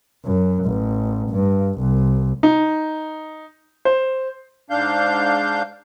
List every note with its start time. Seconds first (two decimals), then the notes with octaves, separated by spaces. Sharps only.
0.25 F#2
0.65 A1
1.30 G2
1.80 C2
2.43 D#4
3.85 C5
4.70 G#2 D4 F5 G6